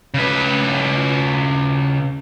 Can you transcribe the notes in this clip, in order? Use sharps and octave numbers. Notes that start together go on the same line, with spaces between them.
C#3 B4